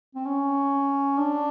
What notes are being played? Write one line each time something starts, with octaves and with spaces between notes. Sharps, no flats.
C4
C#4
D4